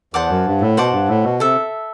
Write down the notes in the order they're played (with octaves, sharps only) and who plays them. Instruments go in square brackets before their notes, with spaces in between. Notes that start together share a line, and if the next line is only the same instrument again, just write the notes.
[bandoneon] E2 [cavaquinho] C5 F#5 A5 D6
[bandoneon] F#2
G2
A2
[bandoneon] B2 [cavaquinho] C5 F#5 A5 D6
[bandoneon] G2
A2
B2
[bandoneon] C3 [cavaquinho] A4 E5